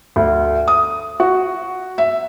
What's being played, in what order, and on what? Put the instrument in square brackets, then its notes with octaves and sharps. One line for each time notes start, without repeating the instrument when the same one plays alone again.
[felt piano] D2
D#6
F#4
E5